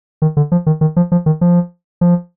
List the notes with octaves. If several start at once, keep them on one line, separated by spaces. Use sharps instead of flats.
D#3
D3
F3
D#3
D#3
F3
F3
D#3
F3
F3